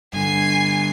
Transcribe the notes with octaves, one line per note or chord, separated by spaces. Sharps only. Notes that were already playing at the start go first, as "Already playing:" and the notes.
G2 D3 G#5 C7